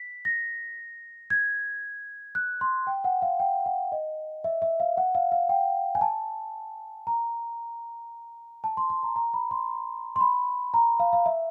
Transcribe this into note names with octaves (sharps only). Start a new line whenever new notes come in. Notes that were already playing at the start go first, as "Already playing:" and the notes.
Already playing: B6
A#6
G#6
F#6
C6
G5
F#5
F5
G5
F#5
D#5
E5
E5
F5
F#5
F5
F5
G5
G#5
A5
A#5
A5
C6
C6
A#5
A#5
B5
C6
C6
B5
A#5
F5
F5
E5